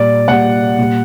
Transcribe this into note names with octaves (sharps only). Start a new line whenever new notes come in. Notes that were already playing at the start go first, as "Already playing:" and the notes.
Already playing: A#2 G3 D5
A#2 G3 F#5
A#2 G3